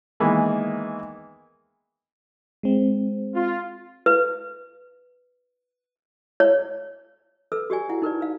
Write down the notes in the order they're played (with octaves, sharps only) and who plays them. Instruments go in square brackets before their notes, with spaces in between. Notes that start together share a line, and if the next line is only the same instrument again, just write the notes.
[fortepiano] D#3 E3 G#3 A#3 B3
[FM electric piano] G#3 C4
[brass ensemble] F4
[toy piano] B4
C#5
A4 B4 E6
F#4 G4 D5 G#5
E4 F#5
D#4 A#4 B4 D5
B4 F5